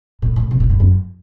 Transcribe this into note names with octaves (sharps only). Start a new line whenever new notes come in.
A2
A2
B2
A2
G2
F#2